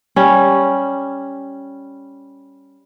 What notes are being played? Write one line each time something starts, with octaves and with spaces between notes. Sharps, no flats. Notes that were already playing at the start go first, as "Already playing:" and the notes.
G3 C#4